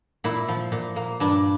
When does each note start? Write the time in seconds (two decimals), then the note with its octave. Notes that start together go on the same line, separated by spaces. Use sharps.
0.24 A#2 E4
0.48 F3
0.72 A#2
0.96 A#3
1.20 G2 D4